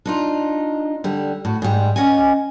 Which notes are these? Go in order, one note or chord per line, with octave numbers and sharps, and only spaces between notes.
D4 D#4 F4
D3 G3
A2 F#4
G#2 G3
C#4 D#5 F#5 G#5